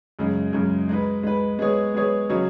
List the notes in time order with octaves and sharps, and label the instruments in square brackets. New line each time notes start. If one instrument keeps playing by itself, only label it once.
[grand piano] F#2 C#3 G#3 D#4
F#2 C#3 G#3 D#4
G#3 D#4 B4
G#3 D#4 B4
G#3 B3 G#4 C#5
G#3 B3 G#4 C#5
C#3 F#3 D#4 G#4 C#5